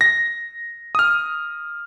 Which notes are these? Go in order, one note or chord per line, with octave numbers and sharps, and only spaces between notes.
A#6
D#6 F6